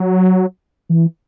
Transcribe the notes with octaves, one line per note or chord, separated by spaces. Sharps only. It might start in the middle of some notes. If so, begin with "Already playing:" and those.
Already playing: F#3
E3